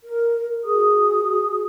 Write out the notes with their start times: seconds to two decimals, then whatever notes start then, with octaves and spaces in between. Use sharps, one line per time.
0.03 A#4
0.64 F#4 G#4 D#6